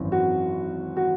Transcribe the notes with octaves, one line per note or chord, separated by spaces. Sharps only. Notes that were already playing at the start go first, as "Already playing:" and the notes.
Already playing: G#1 F#2 E3
F#4
F#4